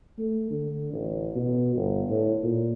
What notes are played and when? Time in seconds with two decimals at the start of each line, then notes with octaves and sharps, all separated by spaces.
0.18 A3
0.51 D3
0.93 A1
1.35 B2
1.76 G1
2.10 A2
2.43 A#2